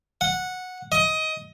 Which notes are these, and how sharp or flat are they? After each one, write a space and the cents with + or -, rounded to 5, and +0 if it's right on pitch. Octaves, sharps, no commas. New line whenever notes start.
F#5 -10
D#5 +20